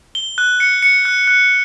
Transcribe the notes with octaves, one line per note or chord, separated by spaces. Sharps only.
G7
F#6
C#7
C#7
F#6
F#6